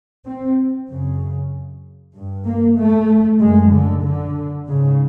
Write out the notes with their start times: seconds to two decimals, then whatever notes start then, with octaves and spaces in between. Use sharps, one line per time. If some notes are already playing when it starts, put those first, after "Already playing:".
0.24 C4
0.89 F#2 C#3
2.15 G2
2.46 A#3
2.77 A3
3.40 F#2 C#3 G#3
3.72 D3
4.04 D3
4.67 G#2 C#3